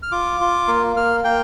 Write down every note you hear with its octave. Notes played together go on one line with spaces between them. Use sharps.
F6
F4 D6
F4
A#3
A#3 F6
A#3 G5